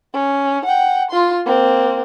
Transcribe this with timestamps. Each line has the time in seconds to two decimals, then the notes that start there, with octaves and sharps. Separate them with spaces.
0.14 C#4
0.65 F#5 G5
1.11 F4 C6
1.46 A#3 C4